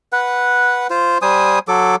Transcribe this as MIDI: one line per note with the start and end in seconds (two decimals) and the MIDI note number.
0.12 0.87 71
0.12 0.87 78
0.90 1.18 65
0.90 1.18 72
1.22 1.59 55
1.22 1.59 72
1.22 1.59 80
1.22 1.59 87
1.68 1.96 54
1.68 1.96 69
1.68 1.96 86